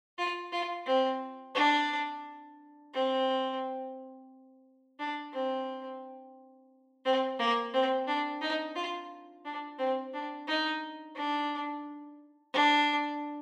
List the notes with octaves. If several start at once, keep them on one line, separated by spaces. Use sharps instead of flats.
F4
F4
C4
D4
C4
D4
C4
C4
A#3
C4
D4
D#4
F4
D4
C4
D4
D#4
D4
D4